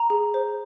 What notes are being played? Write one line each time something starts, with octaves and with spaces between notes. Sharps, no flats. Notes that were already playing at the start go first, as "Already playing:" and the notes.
Already playing: A#5
G#4
C5